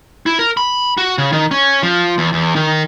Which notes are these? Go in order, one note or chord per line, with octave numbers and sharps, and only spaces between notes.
E4
A#4
B5
F#4
C#3
D#3
C#4
F3
E2
E2
D#3